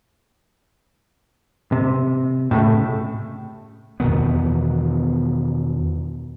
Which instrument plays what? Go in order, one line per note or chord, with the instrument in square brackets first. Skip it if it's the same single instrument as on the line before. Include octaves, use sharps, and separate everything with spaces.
[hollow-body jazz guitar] C3
A2 C#3 A3
[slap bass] E2 B2 D#3 B3